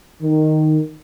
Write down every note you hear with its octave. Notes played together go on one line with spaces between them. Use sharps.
D#3